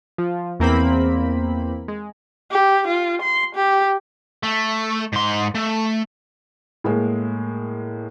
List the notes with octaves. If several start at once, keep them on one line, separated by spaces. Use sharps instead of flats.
F3
E2 A#3 C4 B5
G#3
G4
F4
C6
G4
A3
G#2 C6
A3
A2 G#3 A#3